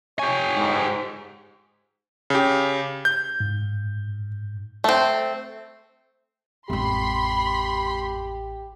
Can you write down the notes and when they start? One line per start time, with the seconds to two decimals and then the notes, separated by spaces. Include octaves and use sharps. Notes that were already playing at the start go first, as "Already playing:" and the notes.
0.19 G4 C#5 G#5
0.56 G#2
2.30 C#3 G4
3.05 G6
3.40 G#2
4.84 A3 C4
6.70 A1 F2 G#3 G4 B5 C6